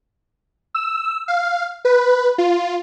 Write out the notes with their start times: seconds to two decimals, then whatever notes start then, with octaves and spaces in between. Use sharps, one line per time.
0.75 E6
1.28 F5
1.85 B4
2.38 F4